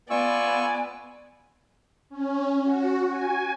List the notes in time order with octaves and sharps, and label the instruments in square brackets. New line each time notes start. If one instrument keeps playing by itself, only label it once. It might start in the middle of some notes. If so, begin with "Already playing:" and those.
[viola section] B3 [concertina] F4 C#6 E6 [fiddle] D5 [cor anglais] G#5
[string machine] C#4
F#4
G#5